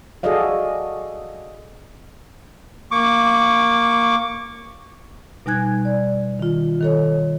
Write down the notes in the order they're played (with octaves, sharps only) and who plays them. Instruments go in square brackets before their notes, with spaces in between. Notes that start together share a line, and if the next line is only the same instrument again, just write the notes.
[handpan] F#4 G#4 A4 D5 D#5 F5
[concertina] A#3 C#6 D6
[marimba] B2 G3 D#4 G#5 F#6 G#6
D5
D#3 F4
D#3 A4 C#5